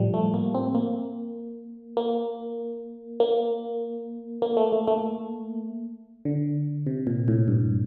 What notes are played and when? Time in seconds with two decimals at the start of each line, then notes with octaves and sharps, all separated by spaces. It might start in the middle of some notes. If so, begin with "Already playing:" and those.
Already playing: A2 F3 G3
0.14 A3
0.34 A#3
0.55 C4
0.75 A#3
1.97 A#3
3.20 A#3
4.42 A#3
4.57 A3
4.72 A3
4.88 A3
6.25 D3
6.87 C3
7.07 A#2
7.28 A2
7.48 G2